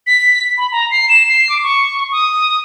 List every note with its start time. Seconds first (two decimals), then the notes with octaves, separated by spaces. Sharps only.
0.07 B6
0.58 B5
0.72 A#5
0.91 C7
1.09 E7
1.29 C7
1.49 D6
1.63 C#6
2.12 D#6